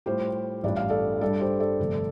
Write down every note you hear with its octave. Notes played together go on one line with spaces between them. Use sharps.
A2 G3 F4 G4 C5
A1 G2 G3 D4 F4 D5
F5
A4 D5
G2 G3 D4 A4 D5
G4 C5
A4 D5
G1 F2 C3 A3